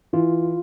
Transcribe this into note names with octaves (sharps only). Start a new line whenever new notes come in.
E3 F4